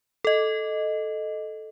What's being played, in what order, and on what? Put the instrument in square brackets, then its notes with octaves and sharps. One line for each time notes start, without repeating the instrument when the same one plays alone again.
[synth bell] A4 D#5